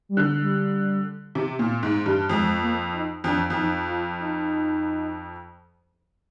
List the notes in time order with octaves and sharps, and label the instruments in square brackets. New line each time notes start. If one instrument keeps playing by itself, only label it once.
[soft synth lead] G3
[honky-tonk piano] D3
[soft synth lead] G3
[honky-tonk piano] C3
A#2
G#2
G2
[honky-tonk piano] F2 [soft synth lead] G#3
[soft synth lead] A#3
D#4
[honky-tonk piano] F2 [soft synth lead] D4
[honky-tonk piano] F2
[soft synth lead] D#4
F4
D#4